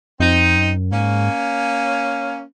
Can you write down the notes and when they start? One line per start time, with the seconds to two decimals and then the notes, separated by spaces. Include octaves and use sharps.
0.20 F2 C4 D#4
0.56 F#2
0.91 G#2 A#3 C#4